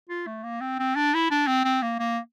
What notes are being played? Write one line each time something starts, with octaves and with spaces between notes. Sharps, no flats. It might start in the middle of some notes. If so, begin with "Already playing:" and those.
F4
A3
A#3
C4
C4
D4
E4
D4
C4
C4
A#3
A#3